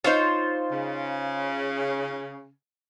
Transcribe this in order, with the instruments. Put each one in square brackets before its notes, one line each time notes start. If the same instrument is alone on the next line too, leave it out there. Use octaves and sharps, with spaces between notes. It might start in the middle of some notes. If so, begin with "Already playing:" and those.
[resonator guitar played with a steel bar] D#4 C#5 [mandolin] F4 C5
[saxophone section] C#3